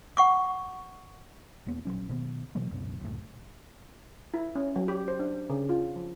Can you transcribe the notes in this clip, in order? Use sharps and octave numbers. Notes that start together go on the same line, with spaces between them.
F#5 C#6 D6
E1 E2 A#3 B3
A#1 E2 F#3 C#4
B2 D#3 B3
B2 E3 F#3 A#3
C#2 F#2 B2
C#2 F#2 A2
E4
C#4
F#3
G4
C5
D4
C#3
F4
F3